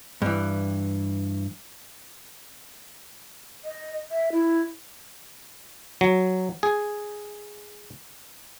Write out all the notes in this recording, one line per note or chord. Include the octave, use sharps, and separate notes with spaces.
G2 E3
D#5
E5
E4
F#3
G#4